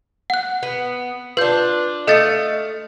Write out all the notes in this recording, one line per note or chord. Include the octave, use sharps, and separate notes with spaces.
F#5 F#6
B3
D4 F4 B4 G6
A3 A4 D#5 F5 A6 C#7